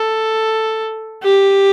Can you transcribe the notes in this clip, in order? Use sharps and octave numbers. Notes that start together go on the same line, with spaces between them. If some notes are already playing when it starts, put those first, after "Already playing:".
Already playing: A4
G4